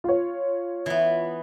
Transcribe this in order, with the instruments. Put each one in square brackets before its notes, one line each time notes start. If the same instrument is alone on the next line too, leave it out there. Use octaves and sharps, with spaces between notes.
[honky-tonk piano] F4 C#5
[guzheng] E3 B3